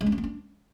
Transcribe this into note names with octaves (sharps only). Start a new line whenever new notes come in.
G#3
D4
C#4
B3
D4